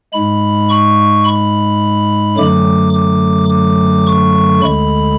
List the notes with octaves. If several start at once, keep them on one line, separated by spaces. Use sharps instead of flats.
G#2 G#3 B5
C#6
B5
F#2 D3 F#3 A3 D6
D6
D6
C#6
D2 D3 G#3 B5